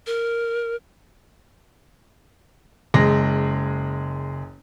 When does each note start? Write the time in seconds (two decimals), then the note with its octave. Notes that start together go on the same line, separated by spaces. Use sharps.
0.07 A#4
2.94 F#1 G#3 A#6